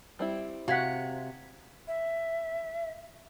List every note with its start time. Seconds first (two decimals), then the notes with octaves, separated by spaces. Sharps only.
0.19 G3 C4 E4
0.68 C3 F#4 F5 F#5 G#6 B6
1.88 E5